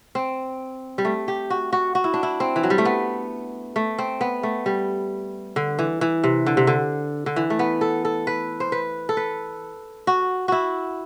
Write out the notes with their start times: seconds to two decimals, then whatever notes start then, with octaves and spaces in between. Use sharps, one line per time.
0.15 C4
0.98 G3
1.05 A3
1.28 G4
1.50 F#4
1.73 F#4
1.95 F#4
2.04 E4
2.14 D4
2.23 E4
2.40 C4
2.56 E3
2.63 F#3
2.70 G3
2.78 A3
2.85 B3
3.76 A3
3.98 C4
4.21 B3
4.43 A3
4.66 G3
5.56 D3
5.79 E3
6.01 E3
6.24 C3
6.46 D3
6.57 C3
6.67 D3
7.26 D3
7.36 E3
7.50 A3
7.59 B3
7.81 A4
8.05 A4
8.27 B4
8.60 C5
8.72 B4
9.09 A4
9.17 B4
10.07 F#4
10.48 E4 F#4